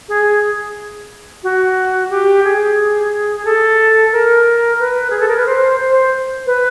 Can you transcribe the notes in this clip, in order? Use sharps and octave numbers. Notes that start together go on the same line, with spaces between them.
G#4
F#4
G4
G#4
G#4
A4
A#4
B4
G#4
A4
A#4
B4
C5
C5
B4